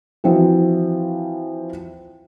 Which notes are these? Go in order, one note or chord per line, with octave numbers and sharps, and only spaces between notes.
E3 F3 C4 F#4